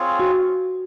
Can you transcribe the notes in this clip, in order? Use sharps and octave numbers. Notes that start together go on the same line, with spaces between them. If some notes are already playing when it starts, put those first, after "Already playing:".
Already playing: C4 F4 G#4 C#5
F#4